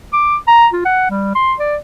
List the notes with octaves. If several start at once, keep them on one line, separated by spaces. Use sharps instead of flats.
D6
A#5
F4
F#5
G3
C6
D5